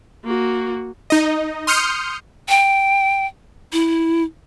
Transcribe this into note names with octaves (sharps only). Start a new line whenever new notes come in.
A#3 F#4
D#4 D#5
C6 D#6 F6 G6 C#7
G5
E4